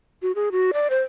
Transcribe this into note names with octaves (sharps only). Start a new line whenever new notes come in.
F#4
G#4
F#4
D5
C5